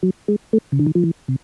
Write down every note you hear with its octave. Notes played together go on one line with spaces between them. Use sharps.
F#3
G#3
A3
C#3
D3
D#3
F3
E3
C3